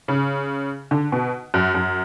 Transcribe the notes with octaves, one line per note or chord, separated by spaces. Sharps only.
C#3
D3
B2
F#2
F#2